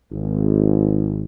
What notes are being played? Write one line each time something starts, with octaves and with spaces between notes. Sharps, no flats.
G#1